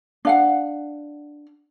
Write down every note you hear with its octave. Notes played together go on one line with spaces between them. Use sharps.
D4 F5 F#5